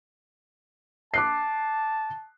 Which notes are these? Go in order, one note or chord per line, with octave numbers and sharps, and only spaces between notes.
A5 D6 F#6 C7